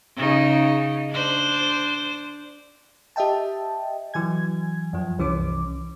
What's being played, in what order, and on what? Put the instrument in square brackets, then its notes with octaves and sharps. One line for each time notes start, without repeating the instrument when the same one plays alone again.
[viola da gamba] C#3 D#4
D4 C5
[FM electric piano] G4 D#5 E5 G5 A5
E3 F#3 G#5 G#6
F#2 F3
C2 E3 C#4 D6